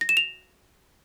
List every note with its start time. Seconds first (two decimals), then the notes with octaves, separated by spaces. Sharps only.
0.01 A#6
0.09 E7
0.17 F7